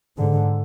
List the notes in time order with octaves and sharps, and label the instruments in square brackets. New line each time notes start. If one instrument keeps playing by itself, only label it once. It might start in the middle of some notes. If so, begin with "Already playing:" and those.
[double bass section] G#2 D3